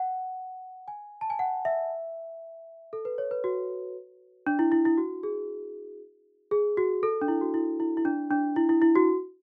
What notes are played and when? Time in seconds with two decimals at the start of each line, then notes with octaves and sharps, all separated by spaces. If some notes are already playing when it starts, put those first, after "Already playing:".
Already playing: F#5
0.88 G#5
1.21 A5
1.30 G#5
1.39 F#5
1.65 E5
2.93 A4
3.05 B4
3.18 C#5
3.31 B4
3.44 F#4
4.47 D4
4.59 E4
4.72 E4
4.85 E4
4.98 F#4
5.23 G#4
6.51 G#4
6.77 F#4
7.03 A4
7.22 D4
7.28 E4
7.41 F#4
7.54 E4
7.80 E4
7.97 E4
8.05 D4
8.31 D4
8.56 E4
8.69 E4
8.82 E4
8.96 F#4